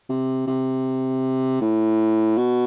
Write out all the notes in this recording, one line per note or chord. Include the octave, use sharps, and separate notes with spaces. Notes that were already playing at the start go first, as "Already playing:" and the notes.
C3
C3
A2
B2